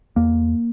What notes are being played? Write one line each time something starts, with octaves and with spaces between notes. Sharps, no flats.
E2 A#3